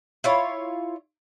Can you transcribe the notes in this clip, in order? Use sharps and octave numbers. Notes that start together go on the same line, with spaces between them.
E4 F4 C#5